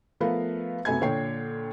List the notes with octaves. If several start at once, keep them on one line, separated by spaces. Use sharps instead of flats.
F3 A3 B3 A#4 B4 F5
F#2 C3 A3 B3 G#5 G#6
A#2 D3 C#5 G5 C7